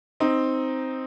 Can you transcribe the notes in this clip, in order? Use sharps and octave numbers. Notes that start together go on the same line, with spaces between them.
C4 D#4